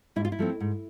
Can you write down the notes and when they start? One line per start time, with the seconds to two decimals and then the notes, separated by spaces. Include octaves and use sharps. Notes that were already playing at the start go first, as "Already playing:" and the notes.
0.16 G#2 E4
0.25 F4
0.32 E4
0.39 F3 A3 C4
0.60 G#2